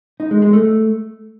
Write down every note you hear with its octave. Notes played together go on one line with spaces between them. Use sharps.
D#4
G#3
G#3
A3